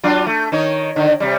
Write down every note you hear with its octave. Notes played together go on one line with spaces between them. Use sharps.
F#3 D4 F4
A3
D#3 D#4 C#5
D3 D#3
C3 G3